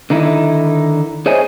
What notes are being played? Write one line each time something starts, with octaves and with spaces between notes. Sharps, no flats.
D3 D#3 D#4 E4
G#4 C5 C#5 D#5 E5 G#5